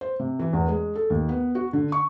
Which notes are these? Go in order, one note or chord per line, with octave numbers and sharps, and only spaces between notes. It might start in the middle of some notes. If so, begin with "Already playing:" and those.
C5
C3
E3
E2
G#3
A4
D#2
B3
F#4
D3
C#6